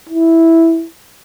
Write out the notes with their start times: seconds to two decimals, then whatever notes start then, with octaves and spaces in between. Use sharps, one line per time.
0.09 E4